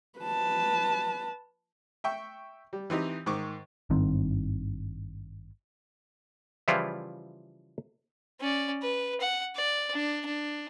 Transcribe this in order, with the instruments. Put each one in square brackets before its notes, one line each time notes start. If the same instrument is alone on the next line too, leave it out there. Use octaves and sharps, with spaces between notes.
[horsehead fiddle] B4 A5
[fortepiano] E5 G5 C#6
G3
E3 C4 D#4 G4
G#2 D#3 C#6 D6
[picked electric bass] G#1 G2 D#3 C4
[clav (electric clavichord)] C#3 E3 F3 G3 E4 F4
[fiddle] C#4 D5
B4
F#5
D5
D4
D4